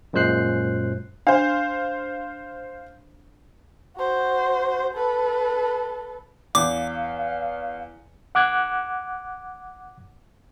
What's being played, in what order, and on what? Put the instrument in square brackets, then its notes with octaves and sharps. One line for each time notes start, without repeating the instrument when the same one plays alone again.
[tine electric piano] F#2 A#2 G#3 C5 F#6 C7
[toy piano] D4 [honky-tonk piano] C5 F5
[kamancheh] F#4 C5
A4 B4
[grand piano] E2 [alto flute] F5 [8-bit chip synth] D6
[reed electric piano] F#5 D6 F#6 G#6